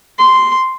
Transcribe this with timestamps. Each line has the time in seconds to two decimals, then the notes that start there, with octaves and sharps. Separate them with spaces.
0.19 C6